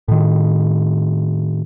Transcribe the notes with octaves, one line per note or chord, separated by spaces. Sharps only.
A2 D#3